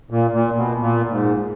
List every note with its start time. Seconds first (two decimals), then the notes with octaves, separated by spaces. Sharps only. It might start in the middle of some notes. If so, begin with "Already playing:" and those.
0.11 A#2
0.34 A#2
0.57 B2
0.80 A#2
1.11 G#2